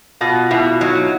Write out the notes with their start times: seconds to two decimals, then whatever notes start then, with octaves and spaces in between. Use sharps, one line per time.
0.21 B2 F4
0.51 B2 E4
0.81 F#3 D#4